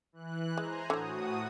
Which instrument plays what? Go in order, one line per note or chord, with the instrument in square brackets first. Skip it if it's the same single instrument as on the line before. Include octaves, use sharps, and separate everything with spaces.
[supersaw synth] E3 F#6
[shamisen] G#3 [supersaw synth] C5 G#5 A#5
[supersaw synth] A2 F#4 D#6 [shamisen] D3 F#3